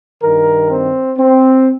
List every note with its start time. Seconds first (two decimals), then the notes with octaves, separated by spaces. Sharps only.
0.23 G2 D#3 A#4
0.71 C4
1.18 C4